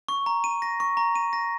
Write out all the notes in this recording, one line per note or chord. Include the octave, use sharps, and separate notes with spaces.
C#6
A#5
D#7
A#6
C#6
A#5
D#7
A#6